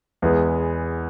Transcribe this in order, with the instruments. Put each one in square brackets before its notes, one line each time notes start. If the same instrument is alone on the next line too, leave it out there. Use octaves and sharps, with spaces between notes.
[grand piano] E2 E3 G#3 B3